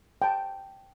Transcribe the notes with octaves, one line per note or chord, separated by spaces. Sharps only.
G5 A5